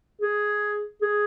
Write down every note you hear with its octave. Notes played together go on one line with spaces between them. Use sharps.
G#4
G#4